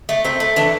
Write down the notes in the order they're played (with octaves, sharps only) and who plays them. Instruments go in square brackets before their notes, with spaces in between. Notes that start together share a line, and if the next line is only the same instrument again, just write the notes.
[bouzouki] A3
A3 C4
A3
E3 D4